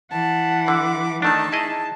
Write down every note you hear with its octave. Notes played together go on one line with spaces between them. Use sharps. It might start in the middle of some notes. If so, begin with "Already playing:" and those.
E3 F#5 A5
D3 D6
D#3 A3 D4 D#4 A5
E4 G#4 D#5